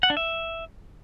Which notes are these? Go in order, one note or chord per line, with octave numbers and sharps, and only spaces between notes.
F#5
D4
E5